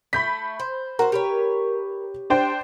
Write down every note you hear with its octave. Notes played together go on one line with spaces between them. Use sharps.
A3 B5 G6 B6
C5
F#4 A#4 C5
G4 B4 C#5
D4 C5 G5